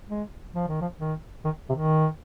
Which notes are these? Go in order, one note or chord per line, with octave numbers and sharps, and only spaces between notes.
G#3
F3
D#3
F3
D#3
D#3
C3
D#3